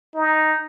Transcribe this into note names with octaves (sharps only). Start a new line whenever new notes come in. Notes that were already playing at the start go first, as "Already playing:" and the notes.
D#4